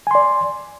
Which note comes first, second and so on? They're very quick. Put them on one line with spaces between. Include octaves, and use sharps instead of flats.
G#5 C6 D5